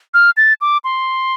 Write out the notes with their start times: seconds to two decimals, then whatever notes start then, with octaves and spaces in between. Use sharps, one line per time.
0.14 F6
0.37 A6
0.61 D6
0.84 C6